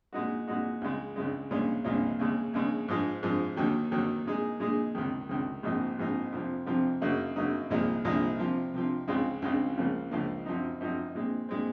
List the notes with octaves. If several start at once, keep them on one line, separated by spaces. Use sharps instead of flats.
A#2 G#3 D#4 F#4
A#2 G#3 D#4 F#4
C#2 C#3 G#3
C#2 C#3 G#3
C2 A#2 G#3 C#4 F4
C2 A#2 G#3 C#4 F4
D#2 C#3 G#3
D#2 C#3 G#3
G#2 F3 G#3
G#2 F3 G#3
D#2 D#3 F#3
D#2 D#3 F#3
A#2 G#3 D#4 G#4
A#2 G#3 D#4 G#4
C#2 C3 D#3
C#2 C3 D#3
A#1 G#2 F3 C4 D#4
A#1 G#2 F3 C4 D#4
F2 C3 F3 C4
F2 C3 F3 C4
F#2 C#3 F#3 A#3 D#4
F#2 C#3 F#3 A#3 D#4
C2 A#2 F3 G#3 D#4
C2 A#2 F3 G#3 D#4
C3 F3 C4
C3 F3 C4
C#2 C#3 G#3 C4 F4
C#2 C#3 G#3 C4 F4
C#2 C#3 F3 A#3
C#2 C#3 F3 A#3
F#2 F3 C4 D#4
F#2 F3 C4 D#4
A#2 G#3 C4
A#2 G#3 C4